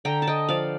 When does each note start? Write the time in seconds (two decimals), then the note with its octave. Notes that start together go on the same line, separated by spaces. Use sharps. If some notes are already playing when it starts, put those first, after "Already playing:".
0.05 D3 G5 A#5
0.22 A5
0.27 D#5 G5
0.49 F3 D5 F5